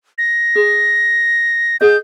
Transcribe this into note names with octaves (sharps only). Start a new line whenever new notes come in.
A#6
G#4
G#4 D#5 G6